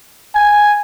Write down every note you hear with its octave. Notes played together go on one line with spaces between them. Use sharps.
G#5